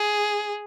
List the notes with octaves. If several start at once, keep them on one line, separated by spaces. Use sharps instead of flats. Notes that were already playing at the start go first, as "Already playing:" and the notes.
Already playing: G#4